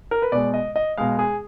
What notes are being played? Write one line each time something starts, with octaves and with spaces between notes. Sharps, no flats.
A#4
B4
B2 G#3 D5
D#5
D#5
B2 G#3 F5
G#4